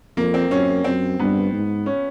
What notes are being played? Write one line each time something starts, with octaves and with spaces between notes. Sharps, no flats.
F2 A#3
C4
F#2 C#4
F#2 C4
G2 B3
G#2
C#4